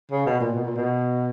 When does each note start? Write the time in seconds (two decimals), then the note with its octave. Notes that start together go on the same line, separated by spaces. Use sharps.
0.11 C#3
0.26 B2
0.40 A#2
0.54 B2
0.65 A#2
0.76 B2